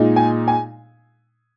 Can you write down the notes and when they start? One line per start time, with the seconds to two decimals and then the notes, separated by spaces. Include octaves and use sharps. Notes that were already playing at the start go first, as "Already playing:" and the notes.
Already playing: A#2 G#3 D#4
0.16 G#5
0.48 G#5